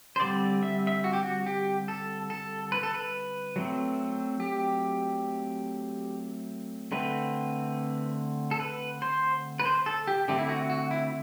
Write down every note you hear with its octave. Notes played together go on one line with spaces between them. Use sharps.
C5
D3 G3 C4 D5
E5
E5
F#4
G4
F#4
G4
A4
A4
B4
A4
B4
F#3 A3 C4
G4
D3 A3 C4 B4
A4
B4
C5
B4
C5
A4
G4
D3 A3 C4 G4
E4
F#4
F#4
E4